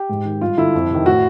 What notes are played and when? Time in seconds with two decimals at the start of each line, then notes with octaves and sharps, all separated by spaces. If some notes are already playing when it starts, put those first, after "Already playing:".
Already playing: G4
0.10 G#2
0.25 D#3
0.41 G2 F4
0.57 D3 E4
0.75 F2
0.91 C3 D#3
1.06 A2 F#4